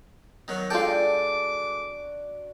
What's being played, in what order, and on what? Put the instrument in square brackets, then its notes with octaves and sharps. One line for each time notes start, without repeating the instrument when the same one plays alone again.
[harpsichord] D#3 F#3 [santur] D#5 F#5
[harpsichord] G#3 A4 [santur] D4 F#4 D5 [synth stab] F4 G5 [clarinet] D6